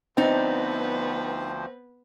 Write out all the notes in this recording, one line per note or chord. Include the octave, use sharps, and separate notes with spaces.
D2 F3 B3 C4 D4 D#4 B4 C5